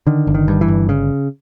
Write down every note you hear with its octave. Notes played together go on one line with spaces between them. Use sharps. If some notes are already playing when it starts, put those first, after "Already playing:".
D3 D#3
G1
D#3
G2
E3
G1
C#3